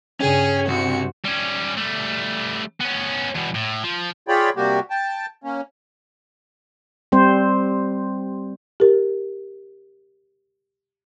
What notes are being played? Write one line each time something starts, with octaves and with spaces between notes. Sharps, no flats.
G2 C#3 C#4 G#4 G5
C2 C4 C#4 F#4 C5 C#7
G3 C#4
G3 A3
B3 C#4
E2 B2
A2
F3
F4 G#4 C#5 D5 G5 B5
C3 G3 A#3 F#4 G4
G5 A5
A#3 C#4
G3 C4 C5
G4 A#4